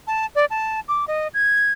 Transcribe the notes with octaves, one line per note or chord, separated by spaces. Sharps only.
A5
D5
A5
D6
D#5
G#6